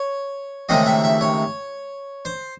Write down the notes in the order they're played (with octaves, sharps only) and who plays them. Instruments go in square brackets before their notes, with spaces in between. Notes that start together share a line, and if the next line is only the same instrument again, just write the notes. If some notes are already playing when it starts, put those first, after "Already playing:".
Already playing: [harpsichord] C#5
C#2 C3 D#3 A3 D#5
E5
E5
C#5
C5